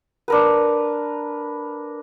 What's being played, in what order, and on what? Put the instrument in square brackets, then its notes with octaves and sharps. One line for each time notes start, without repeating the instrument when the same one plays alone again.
[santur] D4 A#4 B4